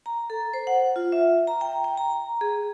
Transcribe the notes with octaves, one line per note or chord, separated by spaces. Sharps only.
A#5
A4
C5
F#5
F4
E5
A#5
G5
G5
A#5
G#4